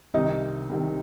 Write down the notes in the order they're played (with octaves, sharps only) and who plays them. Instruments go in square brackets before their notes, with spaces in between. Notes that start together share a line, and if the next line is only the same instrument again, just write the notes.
[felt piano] C2 C3 D#3 D#4 D#5
C2 C3 D#3